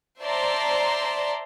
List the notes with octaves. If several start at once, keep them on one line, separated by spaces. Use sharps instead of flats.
C5 D5 E5 A5 A#5 C6